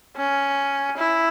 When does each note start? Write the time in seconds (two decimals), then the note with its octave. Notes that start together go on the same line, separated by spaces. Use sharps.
0.17 C#4
0.98 E4